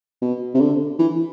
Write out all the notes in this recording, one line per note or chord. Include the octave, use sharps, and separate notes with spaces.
B2
C3
D3
E3